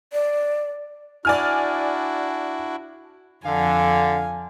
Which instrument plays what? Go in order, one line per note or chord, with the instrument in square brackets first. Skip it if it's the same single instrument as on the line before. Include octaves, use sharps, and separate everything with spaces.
[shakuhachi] D5
[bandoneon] D4 E4 F#4 [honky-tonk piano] D5 G#5 F6
[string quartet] F2 G#5 [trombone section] D3 [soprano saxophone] F5